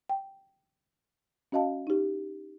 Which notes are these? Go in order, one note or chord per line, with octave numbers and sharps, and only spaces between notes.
G5
C#4 F#4 D#5 F5 A5
D#4 G4